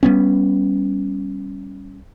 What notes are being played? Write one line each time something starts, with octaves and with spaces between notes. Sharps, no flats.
G3 A#3 B3 C#4